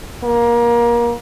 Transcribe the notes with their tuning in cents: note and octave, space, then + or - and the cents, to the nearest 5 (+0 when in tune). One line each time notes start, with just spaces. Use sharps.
A#3 +25